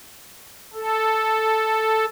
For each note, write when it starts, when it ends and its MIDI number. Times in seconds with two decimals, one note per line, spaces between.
0.74 2.06 69